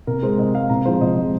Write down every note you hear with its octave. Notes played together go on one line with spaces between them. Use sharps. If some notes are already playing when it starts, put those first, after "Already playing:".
C3 A#4
G#3 C5
C3 D#5
G#3 F5
C3 A#5
F3 G#3 C5
C3 D#5
F3 G#3